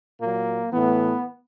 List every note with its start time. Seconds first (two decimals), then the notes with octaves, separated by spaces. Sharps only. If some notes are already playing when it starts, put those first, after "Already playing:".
0.20 A#2 F#3 A#3
0.72 A2 E3 B3